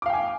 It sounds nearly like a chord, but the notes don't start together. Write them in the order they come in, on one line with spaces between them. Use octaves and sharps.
D6 F5 G5 G#5